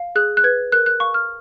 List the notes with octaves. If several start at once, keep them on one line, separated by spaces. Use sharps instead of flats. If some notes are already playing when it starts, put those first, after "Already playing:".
Already playing: F5
G#4 F#6
F#6
B4 G#6
A#4 F#6
F#6
F5 C#6
F6